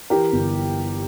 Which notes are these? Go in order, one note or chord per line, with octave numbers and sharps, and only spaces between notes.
E3 G4 A#4
G1